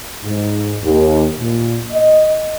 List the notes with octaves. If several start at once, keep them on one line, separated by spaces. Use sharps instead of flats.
G#2
D#2
A#2
D#5